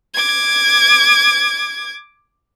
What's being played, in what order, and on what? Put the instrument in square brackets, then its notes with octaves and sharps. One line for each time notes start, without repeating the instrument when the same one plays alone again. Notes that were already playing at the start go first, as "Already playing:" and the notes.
[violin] D6 G#6